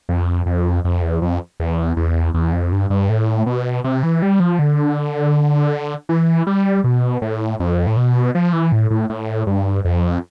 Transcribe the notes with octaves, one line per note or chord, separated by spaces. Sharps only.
F2
F2
F2
E2
F2
E2
E2
E2
F2
G2
G2
A2
B2
C3
E3
G3
F3
D3
E3
G3
B2
A2
F2
A2
B2
F3
E3
A2
A2
A2
G2
F2